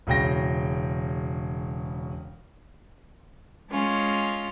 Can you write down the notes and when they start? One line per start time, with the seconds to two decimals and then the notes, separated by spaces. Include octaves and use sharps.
0.07 E1 C#3 G5 A#6
3.69 G#3 C#4 F4